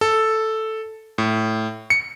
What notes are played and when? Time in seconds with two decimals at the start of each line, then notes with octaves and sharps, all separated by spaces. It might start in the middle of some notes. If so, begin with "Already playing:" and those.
0.01 A4
1.18 A2
1.90 C#7